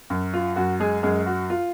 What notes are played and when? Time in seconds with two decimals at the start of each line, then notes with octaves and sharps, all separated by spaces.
0.10 F#2
0.34 F4
0.56 F#2 F#4
0.80 G#3 G#4
1.03 F#2 G#3 G#4
1.26 F#4
1.50 F4